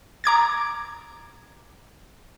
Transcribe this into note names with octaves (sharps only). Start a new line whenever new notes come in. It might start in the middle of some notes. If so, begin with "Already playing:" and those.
A#5 D6 G#6 A6